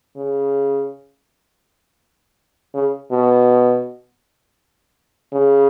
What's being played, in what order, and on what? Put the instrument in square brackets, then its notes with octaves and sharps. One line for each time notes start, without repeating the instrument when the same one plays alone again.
[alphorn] C#3
C#3
B2
C#3